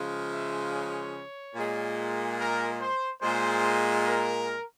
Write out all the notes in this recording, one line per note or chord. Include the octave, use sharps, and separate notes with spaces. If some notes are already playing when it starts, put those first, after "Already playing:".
Already playing: C#3 F3 G#3
E5
C#5
A#2
G#3
A#4
C5
A#2 G#3 C5
A#4